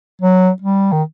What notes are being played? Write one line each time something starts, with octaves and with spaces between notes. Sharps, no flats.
F#3
G3
D#3